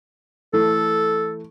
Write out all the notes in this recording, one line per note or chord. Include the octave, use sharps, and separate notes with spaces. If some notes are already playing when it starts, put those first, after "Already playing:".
E3 A3 A4